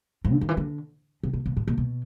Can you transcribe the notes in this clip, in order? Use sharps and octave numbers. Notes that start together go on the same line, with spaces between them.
G#2
D3
D#3
E3
D3
C3
B2
B2
A2
A#2
B2